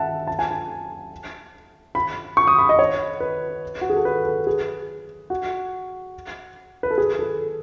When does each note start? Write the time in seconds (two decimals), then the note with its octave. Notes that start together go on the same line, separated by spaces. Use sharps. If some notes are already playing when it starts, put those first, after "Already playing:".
Already playing: E5 F#5 A5
0.27 A5
0.39 G#5
0.51 A5
1.95 B5
2.37 C#6
2.47 D#6
2.58 B5
2.69 D#5
2.79 C#5
3.20 B4
3.81 F#4
3.90 G#4
3.96 A4
4.05 B4
4.25 A4
4.47 G#4
5.30 F#4
6.83 B4
6.91 A4
6.98 G#4
7.19 A4